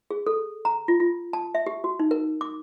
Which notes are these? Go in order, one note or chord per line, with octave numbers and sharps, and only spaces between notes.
G#4
A4
A#5
F4
F4
A5
E5
G4
F#4
D#4
A#4
D6